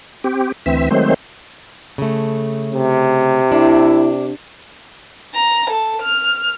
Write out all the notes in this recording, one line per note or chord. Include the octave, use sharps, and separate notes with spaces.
C4 G4
D2 E3 C4 E5
D#3 F#3 G#3 A3 C4 C5
C#3 A3
C3
D4 E4
A#5
A4
F6